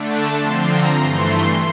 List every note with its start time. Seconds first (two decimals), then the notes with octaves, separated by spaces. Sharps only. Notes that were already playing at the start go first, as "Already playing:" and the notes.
Already playing: D3 A3 D4
0.10 A5
0.38 D3 F3 C4 C6
0.68 A#5
0.97 G2 E3 A3 C6